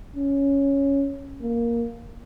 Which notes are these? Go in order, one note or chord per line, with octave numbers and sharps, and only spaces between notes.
C#4
A#3